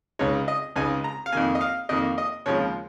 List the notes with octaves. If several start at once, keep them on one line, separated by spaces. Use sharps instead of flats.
C#2 C#3 G#3 D#4 C#5
D#5
C#2 C#3 G#3 D#4 G#5
A#5
F5
F2 D#3 A#3 G#5
D#5
F5
F2 D#3 A#3 D#5
D#5
D#2 C#3 F3 G#3 C#5